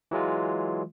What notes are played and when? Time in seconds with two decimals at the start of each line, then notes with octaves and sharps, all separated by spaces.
0.11 E3 F#3 G#3 F4